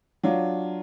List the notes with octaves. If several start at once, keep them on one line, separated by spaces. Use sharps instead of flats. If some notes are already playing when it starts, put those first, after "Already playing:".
F#3 D4 F4